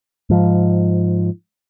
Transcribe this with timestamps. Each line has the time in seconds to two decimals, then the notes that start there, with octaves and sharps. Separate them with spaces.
0.30 G#2 F3